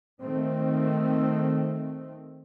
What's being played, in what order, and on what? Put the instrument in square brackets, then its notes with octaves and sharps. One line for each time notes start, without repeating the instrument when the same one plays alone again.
[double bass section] D#3 A3 C4